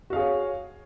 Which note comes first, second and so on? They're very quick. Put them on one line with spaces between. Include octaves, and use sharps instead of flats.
F#4 F5 G#4 C#5